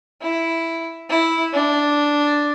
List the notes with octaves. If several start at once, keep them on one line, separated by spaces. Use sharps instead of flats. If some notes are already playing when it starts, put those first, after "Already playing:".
E4
E4
D4